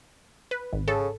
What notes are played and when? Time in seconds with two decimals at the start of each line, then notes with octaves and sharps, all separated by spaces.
0.51 B4
0.73 G#1
0.88 C#3 A4